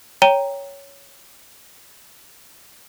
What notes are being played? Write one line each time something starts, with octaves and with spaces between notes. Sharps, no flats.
C#5 G5 A#5 D#7 G7